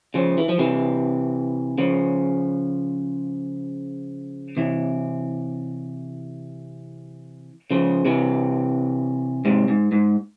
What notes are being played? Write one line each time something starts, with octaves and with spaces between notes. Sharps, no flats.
C#3 F3
E3
F3
C3 E3
C#3 F3
C3 E3
C#3 F3
C3 E3
G#2 C3
G#2
G#2